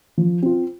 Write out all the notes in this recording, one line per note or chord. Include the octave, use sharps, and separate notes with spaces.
F3
C4 F4